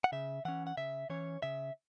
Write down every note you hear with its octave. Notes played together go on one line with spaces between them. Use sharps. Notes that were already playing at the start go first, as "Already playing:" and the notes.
F#5
C#3 E5
E3 C#4 F#5
F#5
C#3 E5
E3 C#4 C#5
C#3 E5